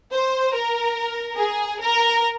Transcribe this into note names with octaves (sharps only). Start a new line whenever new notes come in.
C5
A#4
G#4
A#4